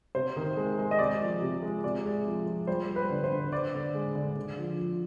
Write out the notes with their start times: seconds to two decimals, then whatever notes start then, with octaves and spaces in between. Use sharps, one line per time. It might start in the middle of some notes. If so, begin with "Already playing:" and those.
0.15 C3 C5
0.37 D#3
0.57 G#3
0.79 G#3
0.91 D#5
0.99 C3 D5
1.21 F3
1.42 C3
1.62 G#3
1.83 C3 D5
2.05 G#3
2.26 F3
2.47 F3
2.67 G3 C5
2.89 G3
2.96 B4
3.10 D3
3.24 C5
3.31 D3
3.52 D3 D5
3.74 D3
3.94 G#3
4.15 D3
4.36 D3
4.57 F3
4.79 F3